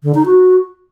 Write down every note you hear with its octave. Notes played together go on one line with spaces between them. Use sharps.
D3
D#4
F#4